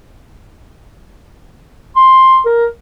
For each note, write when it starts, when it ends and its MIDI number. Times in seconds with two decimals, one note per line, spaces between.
1.96 2.40 84
2.46 2.66 70